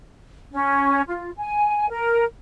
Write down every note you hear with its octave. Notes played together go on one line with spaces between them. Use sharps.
C#4
F4
G#5
A#4